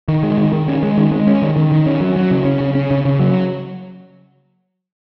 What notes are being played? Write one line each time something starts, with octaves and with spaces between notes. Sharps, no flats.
D#3
G#3
D#3
D#3
C#4
G#3
D#3
G#3
C#4
D#3
D#3
D#3
C#4
F#3
F#3
C#3
C#4
C#3
C#4
C#3
C#3
F#3